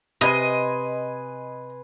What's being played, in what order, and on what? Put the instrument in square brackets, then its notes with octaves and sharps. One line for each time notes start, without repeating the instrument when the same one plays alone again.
[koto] C3 [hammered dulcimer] B4 G#5 C6 [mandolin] D#5